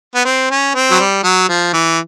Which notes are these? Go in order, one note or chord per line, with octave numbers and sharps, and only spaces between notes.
B3
C4
C#4
C4
F#3
G3
F#3
F3
E3